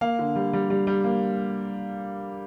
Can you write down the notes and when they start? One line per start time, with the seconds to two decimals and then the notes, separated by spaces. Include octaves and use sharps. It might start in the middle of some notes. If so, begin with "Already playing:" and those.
0.01 A#3 F5
0.19 D3
0.36 G3
0.53 G3
0.70 G3
0.87 G3
1.04 A#3